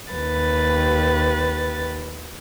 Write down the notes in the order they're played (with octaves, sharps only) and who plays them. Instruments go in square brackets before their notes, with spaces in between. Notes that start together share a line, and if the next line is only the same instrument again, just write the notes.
[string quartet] D#2 B4 A6